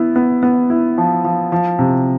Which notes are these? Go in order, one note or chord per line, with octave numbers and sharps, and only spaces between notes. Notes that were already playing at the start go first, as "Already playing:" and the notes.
Already playing: B3 E4
B3
B3
E4
F3
F3
F3
C3